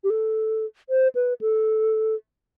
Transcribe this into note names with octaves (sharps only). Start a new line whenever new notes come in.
G4
A4
C5
B4
A4